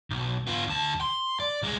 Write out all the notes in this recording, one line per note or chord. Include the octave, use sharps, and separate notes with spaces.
B1
B3 F4
D2 A5
C6
D5
C2 G#3